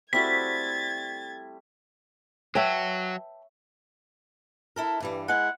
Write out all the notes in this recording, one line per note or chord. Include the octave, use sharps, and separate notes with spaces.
G3 A3 C4 E4 F#4 G#6 A6 B6
F#3 B4 C#5 E5 G5 A5
E4 A4 A#4
G2 E3 G3
G#3 E4 F#5